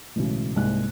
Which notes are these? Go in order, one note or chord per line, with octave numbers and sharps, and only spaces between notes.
B1 A2 C#3 E3 G#3
C2 G#2 G#3 A#3 F#6